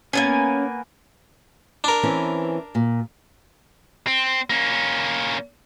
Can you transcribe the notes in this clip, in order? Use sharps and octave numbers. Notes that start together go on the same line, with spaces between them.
A#3 B3 C#4 G#5
D4 A#4
E3 C4 C#4
A#2
C4
A#3 C#4